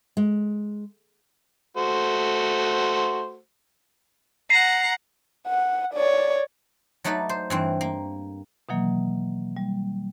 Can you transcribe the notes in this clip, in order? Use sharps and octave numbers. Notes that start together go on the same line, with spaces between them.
G#3
A3 F#4 C5
F#5 A#5 C7
F#5
C#5 D5
F#3 A3 D#4 B4 D5
C5
G2 E3 C4
A#3
B2 D#3 E3 F#3 A#3
G3